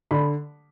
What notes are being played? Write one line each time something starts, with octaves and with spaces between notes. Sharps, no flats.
D3 B5